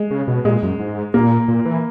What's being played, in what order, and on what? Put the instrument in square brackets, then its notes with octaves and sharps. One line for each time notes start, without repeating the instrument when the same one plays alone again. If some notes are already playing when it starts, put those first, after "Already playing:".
Already playing: [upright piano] G#3
[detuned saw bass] C#3
B2
[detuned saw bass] A#2 [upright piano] G#3
[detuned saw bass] F#2
G#2
[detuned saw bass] A#2 [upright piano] A#3
[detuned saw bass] A#2
E3